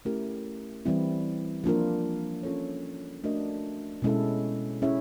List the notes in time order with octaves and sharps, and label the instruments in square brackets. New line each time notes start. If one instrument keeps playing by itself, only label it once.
[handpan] A3 C#4 E4 G4 A#4
E3 G3 C4 E4
F3 A#3 D4 F4 A#4
C#4 F4 A4 C#5
A3 D4 F#4 A#4 D#5
B2 G#3 C#4 E4 A4
C#4 E4 G#4 C#5 E5